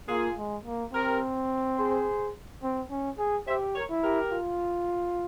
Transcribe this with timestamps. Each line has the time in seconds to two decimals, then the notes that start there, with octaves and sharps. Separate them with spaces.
0.09 A#3 F4 G#4
0.37 G#3
0.65 A#3
0.93 C4 G4 A#4
1.78 G#4 C5
2.63 C4
2.90 C#4
3.18 G#4
3.47 G4 C5 E5
3.75 A#4 C#5
3.90 E4
4.03 G4 A#4
4.32 F4